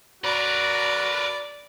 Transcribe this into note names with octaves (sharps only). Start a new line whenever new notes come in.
F#4 A#4 B4 D5